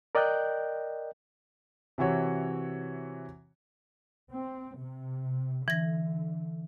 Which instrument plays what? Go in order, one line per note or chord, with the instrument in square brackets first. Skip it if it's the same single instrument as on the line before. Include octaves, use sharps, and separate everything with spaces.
[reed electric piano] A#4 D5 D#5 G5 F#6 G6
[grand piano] C3 E3 F#4 C#5
[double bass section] C4
C3
[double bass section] D3 [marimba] E3 A#6